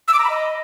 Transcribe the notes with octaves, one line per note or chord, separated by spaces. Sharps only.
E6
D6
A#5
B5
D#5